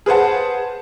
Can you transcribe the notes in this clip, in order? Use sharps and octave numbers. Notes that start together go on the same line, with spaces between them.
G#4 B4 C5 F#5 A5